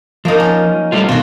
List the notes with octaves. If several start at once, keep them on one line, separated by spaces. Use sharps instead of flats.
F3 A#3 D#4
C#4
G3 A3 F4
B2 D#3 F4 F#4